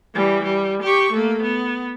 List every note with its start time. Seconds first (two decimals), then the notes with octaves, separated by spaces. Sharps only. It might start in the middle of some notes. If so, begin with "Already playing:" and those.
0.15 E3 G3
0.43 G3
0.83 G4 C#6
1.12 A3 A#3
1.42 B3